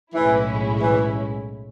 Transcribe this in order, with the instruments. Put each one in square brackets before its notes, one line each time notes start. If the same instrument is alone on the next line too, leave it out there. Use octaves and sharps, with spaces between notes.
[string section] B1 A2 G#3 C#4 E4 [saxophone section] E3
[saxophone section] E3